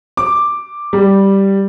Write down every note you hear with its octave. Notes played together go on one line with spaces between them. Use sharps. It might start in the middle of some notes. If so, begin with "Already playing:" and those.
D6
G3